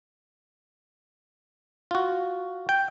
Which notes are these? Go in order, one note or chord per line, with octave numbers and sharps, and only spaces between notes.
F4 F#4
G5